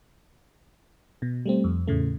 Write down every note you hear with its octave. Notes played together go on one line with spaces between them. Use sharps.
B2
G3 A3 C4
F2
E2 A2 C#3 A3